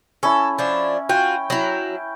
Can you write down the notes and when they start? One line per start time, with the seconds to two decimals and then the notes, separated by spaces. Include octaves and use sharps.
0.23 C#4 E4 A4
0.59 F3 D4
1.09 F4 F#4 G5
1.50 F#3 E4